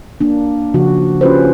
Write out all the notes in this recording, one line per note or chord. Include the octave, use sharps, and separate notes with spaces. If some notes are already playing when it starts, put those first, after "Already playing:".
A#3 D4
C#3 F3 F#4
C#4 F4 G4 B4 C5